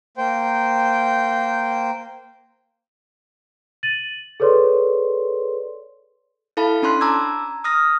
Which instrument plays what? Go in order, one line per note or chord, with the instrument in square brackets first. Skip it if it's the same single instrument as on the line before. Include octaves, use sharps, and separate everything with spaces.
[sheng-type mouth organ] A#3 C5 G5
[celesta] A6 D#7 F#7
G#4 A4 B4 C#5 D5 C6
[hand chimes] E4 A4 F5 A5 B5
C#4 D4 B5 C6 F#6
A5 A#5 D6 E6 G#6
D#6 F6 A#6